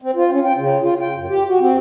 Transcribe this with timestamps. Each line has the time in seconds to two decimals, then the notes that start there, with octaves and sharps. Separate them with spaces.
0.02 C4
0.16 F4
0.31 C#4
0.44 G5
0.57 C#3
0.82 F4
1.01 G5
1.17 F#2
1.29 G4
1.48 F#4
1.60 C4